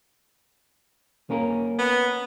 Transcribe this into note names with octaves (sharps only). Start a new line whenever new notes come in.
A#3 C#4 A#4
B3